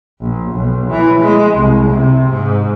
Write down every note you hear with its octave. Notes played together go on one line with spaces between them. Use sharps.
A#1
B1
E3
G#3
C2
C3
G#2